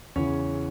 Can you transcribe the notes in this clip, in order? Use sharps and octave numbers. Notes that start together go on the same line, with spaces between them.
E2 C#3 E3 C#4 C#5